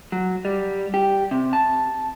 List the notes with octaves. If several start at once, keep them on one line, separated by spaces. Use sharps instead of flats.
F#3
G3
G4
C3
A5